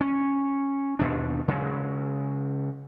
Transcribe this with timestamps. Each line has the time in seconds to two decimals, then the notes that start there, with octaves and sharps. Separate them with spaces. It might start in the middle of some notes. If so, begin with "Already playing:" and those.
0.01 C#4
0.99 D#2 B2 D4
1.48 C#3 F#3 G#3